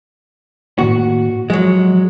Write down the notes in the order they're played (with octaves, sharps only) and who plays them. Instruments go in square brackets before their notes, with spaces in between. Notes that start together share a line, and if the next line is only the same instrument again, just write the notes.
[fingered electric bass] A2 D#3 A#3 [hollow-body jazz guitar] F#4
[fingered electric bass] F3 [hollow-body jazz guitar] F#3 G#3